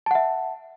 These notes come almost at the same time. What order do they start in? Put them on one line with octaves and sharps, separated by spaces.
A5 F#5 E5